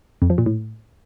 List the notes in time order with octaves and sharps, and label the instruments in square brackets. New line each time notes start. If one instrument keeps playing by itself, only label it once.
[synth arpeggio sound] F2
F3
A#2
A2